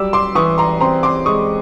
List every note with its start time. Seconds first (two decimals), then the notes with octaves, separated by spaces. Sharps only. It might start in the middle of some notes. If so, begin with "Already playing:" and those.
Already playing: F#3 G3 D6 E6
0.13 C6 D6
0.35 E3 C#6 D#6
0.58 A#5 C6
0.81 C4 A#5 C6
1.03 C6 D6
1.26 G#3 C#6 D#6